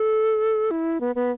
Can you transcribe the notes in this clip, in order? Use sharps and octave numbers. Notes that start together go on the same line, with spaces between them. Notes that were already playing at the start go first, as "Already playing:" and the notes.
Already playing: A4
E4
B3
B3